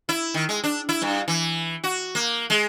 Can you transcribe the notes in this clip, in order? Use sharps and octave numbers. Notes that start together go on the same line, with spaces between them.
E4
D#3
G#3
D4
E4
G2
E3
F#4
A#3
G#3